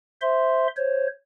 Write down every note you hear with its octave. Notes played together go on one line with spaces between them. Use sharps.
C5 E5 C6
C5 C#5